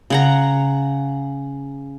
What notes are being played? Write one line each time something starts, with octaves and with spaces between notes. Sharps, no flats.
C#3 F#5 A#5